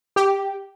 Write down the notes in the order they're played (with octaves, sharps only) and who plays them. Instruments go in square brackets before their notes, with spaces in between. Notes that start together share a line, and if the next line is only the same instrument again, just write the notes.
[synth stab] G4